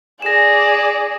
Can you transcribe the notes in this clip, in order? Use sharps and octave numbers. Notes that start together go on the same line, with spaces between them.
G#4 D5 A#6 E7